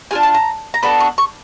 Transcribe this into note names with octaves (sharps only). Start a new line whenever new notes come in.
D4 F4 G#4 G#5
A5
A#5
A#5
B3 D4 F#4 A4 B5
C#6
C#6